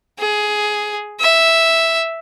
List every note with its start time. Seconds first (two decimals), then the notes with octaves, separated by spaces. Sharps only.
0.19 G#4
1.20 E5